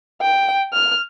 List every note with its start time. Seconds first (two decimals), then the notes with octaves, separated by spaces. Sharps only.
0.21 G5
0.73 F6